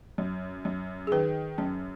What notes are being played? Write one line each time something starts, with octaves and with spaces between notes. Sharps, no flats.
F#2
F#2
G#4
D#3 B4
F#2 C#4